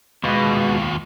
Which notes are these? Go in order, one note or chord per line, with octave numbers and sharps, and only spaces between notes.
D#2 B2 G#3 F4